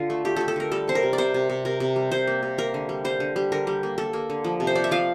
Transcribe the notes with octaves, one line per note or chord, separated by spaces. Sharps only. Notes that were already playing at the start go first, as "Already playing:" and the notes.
Already playing: D3 F4
A3
A3 G4
A3 A4
A4
D3 A#4
G3 A4
C3 C5
A#4
C3
D5
C3 C5
C3
C3
C3 A#4
C3
G3
C3 C5
A#3
C3
A#3 A#4
D3
G3
G3 C5
D3
G3
D3 A#4
G3
A#3
A#3 A4
A#3
D3
F3
C3
C5
C3 D5
E5
F3 F5